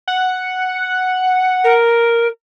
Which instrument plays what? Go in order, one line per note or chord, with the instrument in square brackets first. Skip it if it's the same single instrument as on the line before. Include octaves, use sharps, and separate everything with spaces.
[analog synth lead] F#5
[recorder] A#4